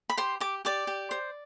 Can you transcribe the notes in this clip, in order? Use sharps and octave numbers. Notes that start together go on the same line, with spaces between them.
B5
G4 C5 C6
G4 D6
G4 D5 D6
G4
C5